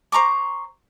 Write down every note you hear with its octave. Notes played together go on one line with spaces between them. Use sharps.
C5 A#5 C#6 D6